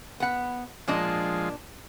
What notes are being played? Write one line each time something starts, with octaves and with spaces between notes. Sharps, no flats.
B3 F#5
A#2 F3 G#3 D4 D#5